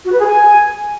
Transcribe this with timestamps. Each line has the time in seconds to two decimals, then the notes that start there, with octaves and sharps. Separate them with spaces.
0.05 F#4
0.12 B4
0.20 G#4
0.27 G#5